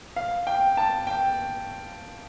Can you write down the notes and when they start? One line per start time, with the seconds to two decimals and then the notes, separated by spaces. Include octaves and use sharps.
0.16 F5
0.47 G5
0.77 A5
1.07 G5